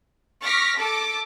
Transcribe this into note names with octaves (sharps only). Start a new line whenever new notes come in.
C#6 D6 F6 A#6 B6
A4 A5 D6